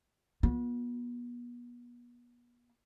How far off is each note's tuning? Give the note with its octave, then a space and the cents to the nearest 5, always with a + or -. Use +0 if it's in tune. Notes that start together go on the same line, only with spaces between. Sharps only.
B3 -35 F4 +40